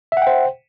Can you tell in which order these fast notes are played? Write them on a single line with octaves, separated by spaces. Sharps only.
E5 F#5 G5 C5